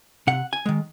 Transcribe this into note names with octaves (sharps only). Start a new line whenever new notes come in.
C3 F#5
G#5
D#3 G#3